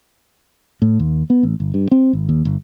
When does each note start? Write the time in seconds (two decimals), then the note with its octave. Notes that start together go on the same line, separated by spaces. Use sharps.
0.82 A2
0.99 D#2
1.30 B3
1.43 A1
1.60 G1
1.74 G2
1.91 C4
2.13 G#1
2.29 D#2
2.45 G1